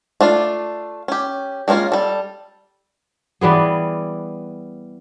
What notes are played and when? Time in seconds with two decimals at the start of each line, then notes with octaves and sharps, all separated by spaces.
0.21 A3 D4 F4
1.08 C#4 G4
1.68 G#3 A#3 B3 C#4 F4
1.92 G3 A4
3.41 E3 G3 B3 G#4